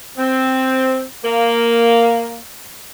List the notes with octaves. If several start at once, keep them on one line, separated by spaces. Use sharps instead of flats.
C4
A#3